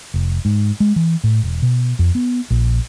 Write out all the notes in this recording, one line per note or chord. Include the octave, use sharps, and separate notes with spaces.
F1
G#2
G#3
E3
A2
E1
B2
F2
B3
A#1